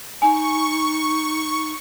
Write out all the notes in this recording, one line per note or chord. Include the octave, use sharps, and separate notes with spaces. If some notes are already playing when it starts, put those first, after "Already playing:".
D#4 G#5 C#6